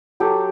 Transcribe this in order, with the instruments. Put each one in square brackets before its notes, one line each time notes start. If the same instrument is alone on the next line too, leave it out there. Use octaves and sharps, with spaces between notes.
[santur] F#3 G4 A4